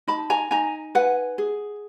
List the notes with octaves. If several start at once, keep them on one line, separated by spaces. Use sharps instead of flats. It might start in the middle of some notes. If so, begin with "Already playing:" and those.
D#4 A5 B5
G#5 A#5
D#4 G#5 A#5
B4 F#5 G#5
G#4